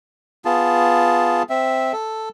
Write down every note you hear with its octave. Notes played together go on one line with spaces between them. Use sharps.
B3 F4 G#4 A5
C4 E5
A4